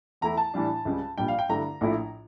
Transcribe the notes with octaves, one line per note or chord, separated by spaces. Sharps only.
E2 E3 A3 E4 A#5
A5
A2 E3 G3 D4
C#2 C#3 G3
A#1 A#2 G3 D4 G5
F5
G5
G2 D3 A3 E4 A#5
A#1 A2 F3 A3 E4